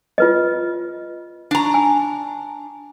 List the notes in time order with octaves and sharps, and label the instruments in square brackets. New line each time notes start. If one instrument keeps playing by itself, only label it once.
[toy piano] F4 B4 D#5
[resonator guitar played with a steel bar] D4 A#5
[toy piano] G#5